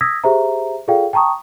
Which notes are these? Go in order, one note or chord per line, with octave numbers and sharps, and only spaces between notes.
D#6 E6 G#6 A#6 B6
G4 G#4 C5 E5 A#5
F4 G#4 A4 D5 F5 G5
G5 A5 A#5 C#6 D#6